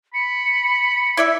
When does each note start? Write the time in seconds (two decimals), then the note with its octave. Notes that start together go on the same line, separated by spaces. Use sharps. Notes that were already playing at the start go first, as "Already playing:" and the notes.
0.14 B5 C#7
1.17 E4 D5 E5